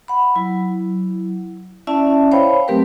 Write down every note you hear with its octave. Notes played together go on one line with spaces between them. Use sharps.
F#5 B5
F#3 E4
C#4 E4 D5 E5 A5
C5 C#5 F5 G5 B5
F#3 A3 C4 G4 A#4 B4